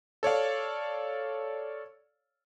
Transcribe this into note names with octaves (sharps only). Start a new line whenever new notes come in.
A4 C#5 D5 F5